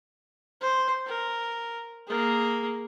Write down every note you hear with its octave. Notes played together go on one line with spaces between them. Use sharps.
C5
A#4
A#3 G#4